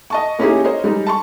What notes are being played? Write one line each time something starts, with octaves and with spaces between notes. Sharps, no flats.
D#5 A5 C#6
A#3 C#4 D#4 E4 G4 G#4
A#4 C5 C#5 D#5
G3 G#3 D#4
A5 C6 C#6